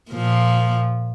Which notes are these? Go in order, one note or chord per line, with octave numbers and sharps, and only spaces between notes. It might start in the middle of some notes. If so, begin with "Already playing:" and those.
A#2 F3